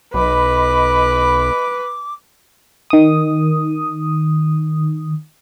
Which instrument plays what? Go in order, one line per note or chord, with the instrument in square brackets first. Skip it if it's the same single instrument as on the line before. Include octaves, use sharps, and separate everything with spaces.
[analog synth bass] B1 [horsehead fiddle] B4 [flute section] D#5 B5 [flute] D6
[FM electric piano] D#3 D#6